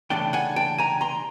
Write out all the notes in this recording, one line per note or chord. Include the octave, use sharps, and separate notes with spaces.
C#3 E3 A3 D4 G5 A5
F#5 G#5
G5 A5
G#5 A#5
A#5 C6